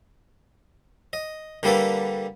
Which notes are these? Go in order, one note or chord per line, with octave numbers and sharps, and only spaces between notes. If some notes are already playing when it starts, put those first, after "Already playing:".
D#5
D3 G3 A#3 A4 B4